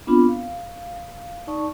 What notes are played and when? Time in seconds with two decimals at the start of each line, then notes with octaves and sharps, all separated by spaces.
0.07 B3 C4 D4 F4 B5
0.29 F5
1.47 D#4 D5 A5 C#6